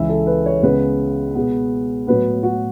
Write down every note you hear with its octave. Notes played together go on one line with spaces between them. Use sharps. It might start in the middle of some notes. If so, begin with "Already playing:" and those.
Already playing: C#2 C#3 E3 E5
A4
B4
C#5
C#2 C#3 G#3 B3 B4
B2 G#3 B3
A2 F#3 B3 B4
F#4